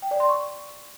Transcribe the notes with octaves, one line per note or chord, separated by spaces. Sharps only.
G5
D5
C6
C#6